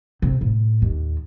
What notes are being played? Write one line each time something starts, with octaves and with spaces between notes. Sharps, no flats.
C3
A2
D#2